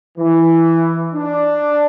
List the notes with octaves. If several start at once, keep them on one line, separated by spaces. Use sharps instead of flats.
E3
D4